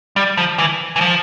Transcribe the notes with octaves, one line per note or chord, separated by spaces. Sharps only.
G3
F3
E3
E3
F3